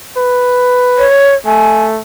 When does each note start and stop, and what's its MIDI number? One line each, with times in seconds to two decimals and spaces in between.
0.17 1.07 71
0.98 1.35 73
1.46 2.00 57
1.46 1.84 80